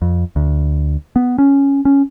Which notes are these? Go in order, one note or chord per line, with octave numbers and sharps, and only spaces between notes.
F2
D2
B3
C#4
C#4